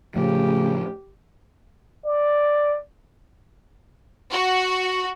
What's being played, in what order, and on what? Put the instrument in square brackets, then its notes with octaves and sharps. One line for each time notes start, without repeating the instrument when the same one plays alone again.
[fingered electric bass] A2 F3 [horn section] C#3 [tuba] A3 [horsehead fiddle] G4
[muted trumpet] D5
[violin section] F#4